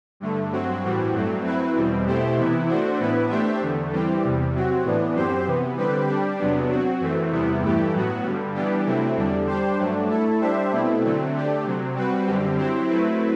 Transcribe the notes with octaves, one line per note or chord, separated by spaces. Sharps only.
G2 D3 A3
G2 F#3 C4 F#4
A2 E3 G3 C4 F#4
G2 F#3 A3 C4
F#3 C4 E4 B4
E2 B2 G3 C4
B2 A3 E4 G4 C5
C3 E3 B3 E4
A3 D4 F#4 C5
A2 E3 B3 E4 B4
A3 D4 G4 C5 E5
E2 D3 A3
E3 G3 C4 G4
E2 C3 G3
C3 F#3 C4 F#4
A2 E3 B3 D4
F#2 F#3 C4 G4 C5
C3 E3 B3
D3 G3 C4 G4 B4
G3 D4 G4
E2 C3 F#3 B3 D4
F#3 C4 F#4
F#2 E3 A3 C4
E2 C3 G3 B3 E4
G2 E3 A3 E4 G4
A2 F#3 B3 F#4
G2 D3 G3
E3 G3 B3 D4 G4
C3 F#3 A3 C4 E4
E2 D3 G3 D4
G3 D4 G4 C5
G2 F#3 A3 D4
A3 E4 A4
G3 D4 G4 C5 E5
B2 A3 C4 E4
D3 F#3 A3 C4
D3 A3 D4 G4
C3 F#3 C4
G3 C4 F#4 B4
F#2 D3 G3 C4 G4
F#3 C4 E4 G4 C5
F#3 A3 C4 E4 B4